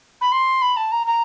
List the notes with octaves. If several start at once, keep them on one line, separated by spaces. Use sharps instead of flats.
B5
C6
B5
A5
A#5
A#5